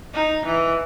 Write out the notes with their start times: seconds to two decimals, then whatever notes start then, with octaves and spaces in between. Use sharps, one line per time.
0.13 D#4
0.45 E3